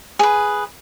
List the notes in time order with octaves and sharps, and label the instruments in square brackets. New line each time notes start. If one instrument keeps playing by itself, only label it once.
[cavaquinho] G#4 B4